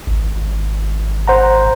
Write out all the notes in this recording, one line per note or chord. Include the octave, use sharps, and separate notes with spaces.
G#1
C5 F#5 A#5